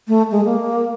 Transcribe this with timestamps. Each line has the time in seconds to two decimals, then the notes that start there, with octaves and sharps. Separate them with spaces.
0.08 A3
0.32 G#3
0.45 A#3